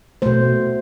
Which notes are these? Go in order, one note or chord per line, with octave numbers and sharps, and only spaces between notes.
B2 A3 C5